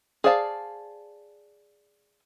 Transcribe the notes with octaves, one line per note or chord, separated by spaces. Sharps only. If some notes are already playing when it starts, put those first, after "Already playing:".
G#4 C5 D5 F5 A5